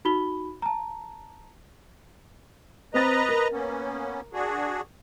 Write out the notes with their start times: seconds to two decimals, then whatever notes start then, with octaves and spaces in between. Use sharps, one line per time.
0.05 D#4 F#4 B5 G7
0.62 A5 A#5
2.94 C4 B4 D#5 A#5 A6
3.29 A#4
3.52 A#3 B3 C#4
4.33 D4 F#4 G#4